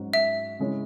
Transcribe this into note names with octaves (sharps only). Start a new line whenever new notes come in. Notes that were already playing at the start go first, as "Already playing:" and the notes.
Already playing: G#2 F#3 C#4 F#4
E5
C#3 G#3 E4 C#5